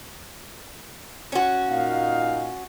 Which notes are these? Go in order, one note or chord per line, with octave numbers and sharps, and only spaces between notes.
C#4 F#4
A#2 D#4 F5